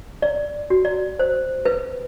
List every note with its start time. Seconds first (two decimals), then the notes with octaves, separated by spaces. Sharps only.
0.22 D5
0.70 F#4
0.85 D5
1.19 C5
1.65 B4